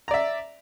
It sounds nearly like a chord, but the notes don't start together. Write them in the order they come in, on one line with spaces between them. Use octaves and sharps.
A#5 D5 E5